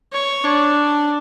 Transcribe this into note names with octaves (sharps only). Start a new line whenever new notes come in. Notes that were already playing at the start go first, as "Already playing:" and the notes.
C#5
D4